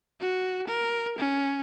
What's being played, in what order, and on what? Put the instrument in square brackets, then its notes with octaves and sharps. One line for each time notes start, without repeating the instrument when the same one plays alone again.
[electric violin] F#4
A#4
C#4